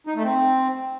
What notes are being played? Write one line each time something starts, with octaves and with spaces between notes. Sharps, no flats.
D#4
A3
C4